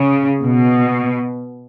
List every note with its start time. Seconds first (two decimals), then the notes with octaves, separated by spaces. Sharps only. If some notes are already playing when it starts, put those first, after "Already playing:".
Already playing: C#3
0.42 B2